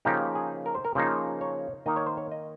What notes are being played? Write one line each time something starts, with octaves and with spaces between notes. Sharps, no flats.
C#3 F3 A#3 D#4 G4
G#4
A#4
C5
A#4
C#3 F3 A#3 D#4 C5
C#5
D#3 A#3 D#4 D#5
C#5
C5
C#5
D#5